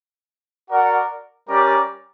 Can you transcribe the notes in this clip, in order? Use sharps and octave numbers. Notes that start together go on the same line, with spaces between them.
F#4 A#4 D5 F#5
G3 C#4 G4 A#4 D5